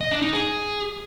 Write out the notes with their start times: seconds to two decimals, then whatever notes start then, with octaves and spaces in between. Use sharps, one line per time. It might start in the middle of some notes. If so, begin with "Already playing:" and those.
0.01 D#5
0.11 D4
0.22 D#4
0.33 G#4